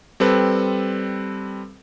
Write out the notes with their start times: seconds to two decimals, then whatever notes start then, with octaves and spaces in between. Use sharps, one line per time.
0.20 G3 C4 A4 B4